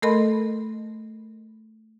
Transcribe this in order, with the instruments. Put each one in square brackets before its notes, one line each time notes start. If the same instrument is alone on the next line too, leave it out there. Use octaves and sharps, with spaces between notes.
[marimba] A3 A4 A#4 D#5 B5 C6